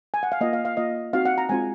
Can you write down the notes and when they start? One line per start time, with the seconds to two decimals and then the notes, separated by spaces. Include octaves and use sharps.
0.14 G#5
0.23 F#5
0.32 F5
0.41 A#3 F4 D#5
0.53 F5
0.65 F5
0.77 A#3 F4 D#5
1.13 C4 D#4 F#4 F5
1.25 F#5
1.38 A#5
1.49 G#3 C4 F4 G#5